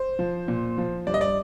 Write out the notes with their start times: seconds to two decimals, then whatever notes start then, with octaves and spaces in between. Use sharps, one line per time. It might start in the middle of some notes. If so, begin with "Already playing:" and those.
Already playing: C5
0.19 F3
0.48 A#2
0.78 F3
1.07 G2 D5
1.14 D#5
1.21 D5